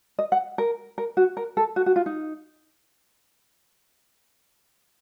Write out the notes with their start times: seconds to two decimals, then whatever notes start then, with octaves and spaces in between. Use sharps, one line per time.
0.19 D#5
0.32 F#5
0.58 A#4
0.98 A#4
1.17 F#4
1.37 A#4
1.57 A4
1.76 F#4
1.86 F#4
1.96 F4
2.06 D#4